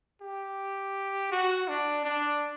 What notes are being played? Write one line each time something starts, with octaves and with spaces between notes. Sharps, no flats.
G4
F#4
D4
D4